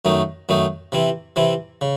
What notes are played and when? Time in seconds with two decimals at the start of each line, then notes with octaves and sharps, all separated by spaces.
0.05 F#2 D#3 A3 D#4
0.49 F#2 D#3 A3 D#4
0.92 C3 E3 C4 E4
1.36 C3 E3 C4 E4
1.81 C#3